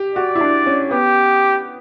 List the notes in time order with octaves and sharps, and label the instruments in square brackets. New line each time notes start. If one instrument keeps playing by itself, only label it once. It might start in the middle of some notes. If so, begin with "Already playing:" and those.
Already playing: [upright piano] G4
[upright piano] F#4 [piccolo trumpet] D5
[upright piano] E4
D4
C#4
[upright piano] B3 [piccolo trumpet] G4